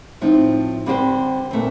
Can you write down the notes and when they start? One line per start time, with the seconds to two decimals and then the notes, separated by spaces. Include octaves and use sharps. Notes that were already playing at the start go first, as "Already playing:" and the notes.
0.21 A2 F3 C4 D#4
0.86 D3 G3 C4 G4 C5
1.51 A#2 A3 C4